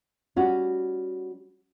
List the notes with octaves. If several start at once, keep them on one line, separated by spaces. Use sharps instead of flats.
G3 C#4 F#4